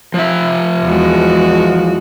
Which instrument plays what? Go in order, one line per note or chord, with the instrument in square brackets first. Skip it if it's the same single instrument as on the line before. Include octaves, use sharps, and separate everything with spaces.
[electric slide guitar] F3 E5
[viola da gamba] E2 G#3 F#4